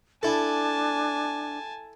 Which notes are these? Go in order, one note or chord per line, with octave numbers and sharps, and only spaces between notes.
D4 E4 A4 G#5 A5